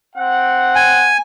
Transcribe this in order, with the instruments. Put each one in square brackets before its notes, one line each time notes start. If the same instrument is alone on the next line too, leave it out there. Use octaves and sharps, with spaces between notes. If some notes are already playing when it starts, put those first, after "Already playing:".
[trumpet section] C4 F#5
[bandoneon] G#5